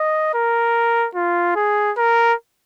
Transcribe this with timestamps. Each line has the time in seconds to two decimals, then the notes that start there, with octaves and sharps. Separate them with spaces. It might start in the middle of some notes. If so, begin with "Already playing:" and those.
Already playing: D#5
0.34 A#4
1.15 F4
1.56 G#4
1.97 A#4